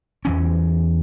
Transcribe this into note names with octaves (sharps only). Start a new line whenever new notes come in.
E2 E3 C#4